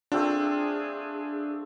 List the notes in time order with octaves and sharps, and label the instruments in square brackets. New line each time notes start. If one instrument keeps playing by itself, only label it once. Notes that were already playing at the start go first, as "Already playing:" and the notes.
[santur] A3 C4 F4 [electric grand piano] D4 [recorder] G#4